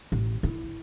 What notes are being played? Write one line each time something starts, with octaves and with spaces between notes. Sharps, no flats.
A1
E4